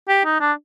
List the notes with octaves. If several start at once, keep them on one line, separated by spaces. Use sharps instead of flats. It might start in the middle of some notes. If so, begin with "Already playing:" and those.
G4
D#4
D4